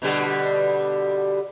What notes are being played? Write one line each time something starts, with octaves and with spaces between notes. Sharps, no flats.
B2 D3 G3